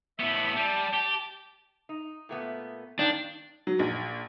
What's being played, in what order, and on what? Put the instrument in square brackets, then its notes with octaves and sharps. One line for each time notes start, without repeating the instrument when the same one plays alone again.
[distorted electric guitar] A2 B3 [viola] E5 B5
[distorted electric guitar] G3 [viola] A5
[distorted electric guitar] G4
[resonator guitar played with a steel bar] D#4
A#2 A3 B3
[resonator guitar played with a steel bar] G2 D#3 [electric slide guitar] D4
[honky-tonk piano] F#3
A#1